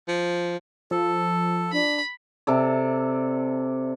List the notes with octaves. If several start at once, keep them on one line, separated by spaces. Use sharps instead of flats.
F3
F3 A4
D4 B5
C3 A4 D5